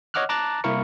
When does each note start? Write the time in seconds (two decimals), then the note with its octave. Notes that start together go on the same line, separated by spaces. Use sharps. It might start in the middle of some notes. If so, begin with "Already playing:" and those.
0.14 C#5 D#5 F#5 D6 F6 F#6
0.29 A5 A#5 D6 F#6 A6 A#6
0.64 C2 A#3 E4 A#4 C#6 C#7